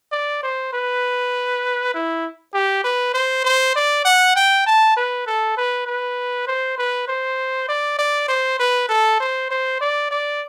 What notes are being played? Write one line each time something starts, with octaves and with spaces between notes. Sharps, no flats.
D5
C5
B4
E4
G4
B4
C5
C5
D5
F#5
G5
A5
B4
A4
B4
B4
C5
B4
C5
D5
D5
C5
B4
A4
C5
C5
D5
D5